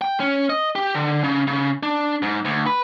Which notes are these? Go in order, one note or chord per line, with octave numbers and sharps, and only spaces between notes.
G5
C#4
D#5
G4
D3
C#3
C#3
D4
G#2
D2
B4